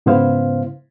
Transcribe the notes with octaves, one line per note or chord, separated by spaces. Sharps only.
G#2 C#3 B3 E4 C5 F5